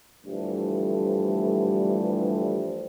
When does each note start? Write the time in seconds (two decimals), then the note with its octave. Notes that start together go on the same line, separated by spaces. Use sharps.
0.24 G2 D3 E3 F3 G3 A3